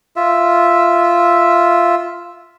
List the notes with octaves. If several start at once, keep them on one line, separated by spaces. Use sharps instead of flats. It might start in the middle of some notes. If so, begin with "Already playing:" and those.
F4 E5